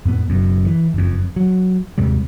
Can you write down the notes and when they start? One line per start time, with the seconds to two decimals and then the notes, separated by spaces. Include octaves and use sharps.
0.05 F2 A2 B3
0.28 F#1 F#2 B2
0.66 E3
0.94 F#1 F2
1.36 F#3
1.98 D#2 G#2 C3 G3